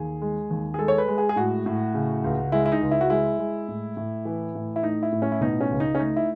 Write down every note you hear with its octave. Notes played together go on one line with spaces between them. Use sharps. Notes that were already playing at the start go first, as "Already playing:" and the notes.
Already playing: D#2 G#4
G#3
D#2
G#4
G#3 A4
C#5
B4
G#3
G#4
G#4
A2 F#4
A2
C#3
C#2
G#3 E4
E4
D#4
C#2
E4
F#4
G#3 E4
G#3
A2
A2
E3
A2
E4
A3 D#4
E4
A2
C#4
E4
B2 D#4
C#4
C#2
D#4
C#4
A3 D#4
E4